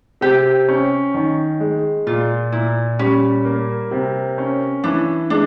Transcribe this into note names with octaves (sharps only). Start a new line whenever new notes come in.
C3 G4
C#4
D#3
G#3
A#2 F4
A#2 E4
G3 C#4
A#3
C3
C#4
E3 D4
G#3 D4